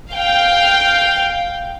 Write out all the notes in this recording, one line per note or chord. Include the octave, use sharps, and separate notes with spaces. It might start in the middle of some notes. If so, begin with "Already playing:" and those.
F5 G5